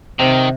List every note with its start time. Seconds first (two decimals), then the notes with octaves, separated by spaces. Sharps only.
0.19 C3 D#3